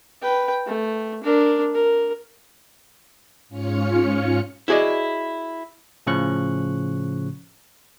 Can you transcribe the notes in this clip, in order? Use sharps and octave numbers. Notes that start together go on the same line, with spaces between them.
B4 G5
A3
D4 A#4
A#4
G#2 C#4 F4 C#5 F6 C#7
E4 F#4 G#4 D5 D#5
A2 C#3 F3 C#4 C#6 F#6